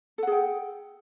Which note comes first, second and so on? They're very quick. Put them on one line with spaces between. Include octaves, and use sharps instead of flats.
A4 F#5 G#4 G5